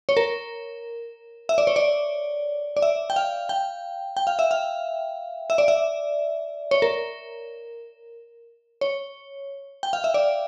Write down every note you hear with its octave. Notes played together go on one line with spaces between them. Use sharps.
C#5
A#4
E5
D5
C#5
D5
D5
E5
G5
F5
G5
G5
F5
E5
F5
E5
D5
E5
C#5
A#4
C#5
G5
F5
E5
D5